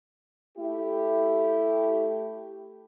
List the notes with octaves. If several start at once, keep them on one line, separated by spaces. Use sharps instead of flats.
A3 E4 G4